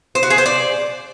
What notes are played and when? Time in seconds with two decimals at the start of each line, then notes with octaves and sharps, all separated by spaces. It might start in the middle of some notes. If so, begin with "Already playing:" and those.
0.15 C5
0.23 F#4
0.30 G#4
0.38 C5
0.46 D5